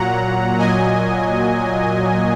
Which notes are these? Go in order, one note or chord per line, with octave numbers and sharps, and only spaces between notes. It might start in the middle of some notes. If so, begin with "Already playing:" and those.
Already playing: A#2 F#3 F#5 A#5
A#2 F#3 D#5 G#5